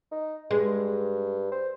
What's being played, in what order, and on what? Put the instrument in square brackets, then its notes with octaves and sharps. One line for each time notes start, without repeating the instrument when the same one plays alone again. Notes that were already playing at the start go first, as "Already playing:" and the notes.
[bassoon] D#4
[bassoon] G2 [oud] G#3
[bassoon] C5